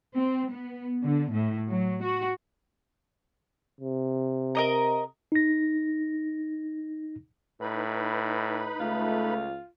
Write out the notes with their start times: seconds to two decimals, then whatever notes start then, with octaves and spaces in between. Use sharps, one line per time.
0.15 C4
0.50 B3
1.03 D3
1.32 A2
1.70 F#3
2.04 F#4
3.80 C3
4.55 A#4 D#5 A#5
5.32 D#4 A#6
7.61 A2 D#4 B4 B5
8.80 C#2 A3 F4